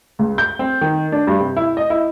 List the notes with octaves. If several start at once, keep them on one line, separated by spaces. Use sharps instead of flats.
C#2
G6
C4
D#3
D4
G2
C3
E4
D#5
E4